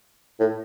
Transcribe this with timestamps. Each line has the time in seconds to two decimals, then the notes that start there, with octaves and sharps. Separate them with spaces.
0.40 A2